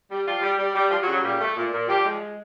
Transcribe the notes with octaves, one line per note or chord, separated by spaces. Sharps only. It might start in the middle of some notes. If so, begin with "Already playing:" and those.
G3
F3 G3 F4
G3
G3
G3
F3 G3 F4
F#3 F#4
C#3
F#3 F#4
A#2 G3 G4
A3
A#2
A#2
F3 G3 G4
G#3